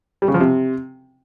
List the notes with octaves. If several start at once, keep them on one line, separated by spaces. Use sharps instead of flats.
G3
C#3
F3
C3